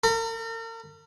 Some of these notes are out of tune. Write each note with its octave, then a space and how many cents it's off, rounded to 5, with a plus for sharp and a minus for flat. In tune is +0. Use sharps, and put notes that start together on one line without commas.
A#4 -45 B5 -25